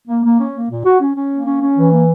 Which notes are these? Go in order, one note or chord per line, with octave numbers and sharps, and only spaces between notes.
A#3
A#3
C#4
A#3
A#2
F#4
C#4
C#4
A#3
C#4
C#4
E3
A#3